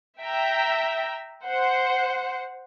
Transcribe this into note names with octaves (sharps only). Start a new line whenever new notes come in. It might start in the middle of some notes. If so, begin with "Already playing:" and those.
E5 G5 A#5
C5 F#5